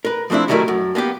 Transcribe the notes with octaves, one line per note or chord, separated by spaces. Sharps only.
A#4 B4
F3 A3 C4 D4 E4
D#3 F#3 G3 A3 E4 A#4
F#2
A#3 B3 E4 G4